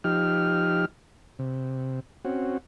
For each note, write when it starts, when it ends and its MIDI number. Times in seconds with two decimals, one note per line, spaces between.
0.04 0.85 53
0.04 0.85 63
0.04 0.85 67
0.04 0.85 89
1.39 2.00 48
2.25 2.58 60
2.25 2.58 61
2.25 2.58 66